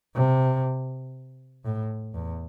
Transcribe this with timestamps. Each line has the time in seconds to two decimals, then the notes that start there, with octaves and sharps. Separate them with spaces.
0.15 C3
1.65 A2
2.14 E2